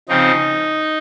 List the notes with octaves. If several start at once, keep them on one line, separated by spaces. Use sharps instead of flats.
C#3 F3 C4 D#4